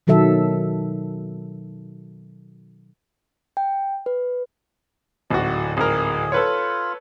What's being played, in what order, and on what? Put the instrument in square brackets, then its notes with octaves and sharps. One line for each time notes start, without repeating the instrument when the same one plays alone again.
[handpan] B2 D#3 F#3 A4 E5
[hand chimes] G5
B4
[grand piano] D1 [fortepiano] G#1 F#4 [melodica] D5
[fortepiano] G#1 A#4 [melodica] G#4
[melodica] F4 [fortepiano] A4 B4 C#5